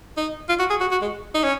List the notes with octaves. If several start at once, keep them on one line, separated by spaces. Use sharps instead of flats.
D#4
F4
F#4
G#4
F#4
F#4
G#3
D#4
C#4